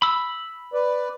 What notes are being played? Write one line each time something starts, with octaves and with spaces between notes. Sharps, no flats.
B5 E6
B4 D5